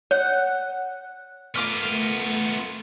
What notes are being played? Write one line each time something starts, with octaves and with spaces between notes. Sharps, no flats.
C#5 F#5
A3 B3 F4 A#4 D6 F6